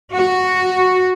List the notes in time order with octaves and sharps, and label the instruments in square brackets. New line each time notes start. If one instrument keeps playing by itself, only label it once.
[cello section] F#4